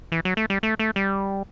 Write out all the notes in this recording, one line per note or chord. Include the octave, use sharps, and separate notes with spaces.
E3
F#3
A3
G3
A3
A3
G3